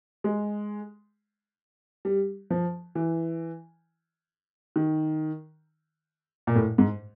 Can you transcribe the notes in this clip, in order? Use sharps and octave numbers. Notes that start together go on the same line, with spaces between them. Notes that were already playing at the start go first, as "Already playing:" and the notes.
G#3
G3
F3
E3
D#3
A#2
A2
G#2